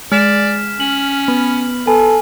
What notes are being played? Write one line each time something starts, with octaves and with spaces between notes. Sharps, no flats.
G#3 D5 F6 B6 E7
C#4 F#7
B3
B3 A4 G#5